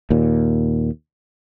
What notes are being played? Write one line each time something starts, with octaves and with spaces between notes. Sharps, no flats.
D#2 A#2